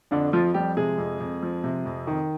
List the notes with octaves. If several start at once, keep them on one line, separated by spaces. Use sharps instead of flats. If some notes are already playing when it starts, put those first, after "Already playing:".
F2 D3 D4
F2 F3 F4
F3 G3 G4
C3 G#3 G#4
F2
F2
F3
C3
F2
D#3